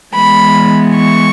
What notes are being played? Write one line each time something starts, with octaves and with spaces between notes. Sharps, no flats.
E3 G#3 B3 B5
C#6